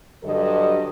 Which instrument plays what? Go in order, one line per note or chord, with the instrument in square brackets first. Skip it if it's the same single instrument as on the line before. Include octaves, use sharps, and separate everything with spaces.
[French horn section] G2 D3 F#3 A4 D#5